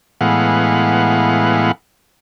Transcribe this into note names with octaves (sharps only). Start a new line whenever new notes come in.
A2 E3 G#3 B3 F5 F#5